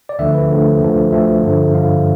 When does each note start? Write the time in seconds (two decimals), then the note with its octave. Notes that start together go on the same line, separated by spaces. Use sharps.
0.09 D5
0.19 D2 D3 F3 E5
0.34 B4
0.50 D2 D3 F3
0.81 D2 D3 F3
1.12 D2 D3 F3 E5
1.43 G2 D3 F3
1.75 G2 D3 F3 F5